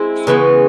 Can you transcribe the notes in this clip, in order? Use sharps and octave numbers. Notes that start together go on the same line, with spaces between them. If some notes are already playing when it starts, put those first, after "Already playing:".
Already playing: G#3 C4 E4
C#3 E3 G#3 B3